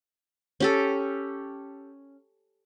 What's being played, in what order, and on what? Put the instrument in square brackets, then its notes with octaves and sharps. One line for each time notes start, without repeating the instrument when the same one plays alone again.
[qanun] C#4 G4 A4